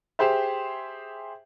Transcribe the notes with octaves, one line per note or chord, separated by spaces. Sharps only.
G4 G#4 C5 E5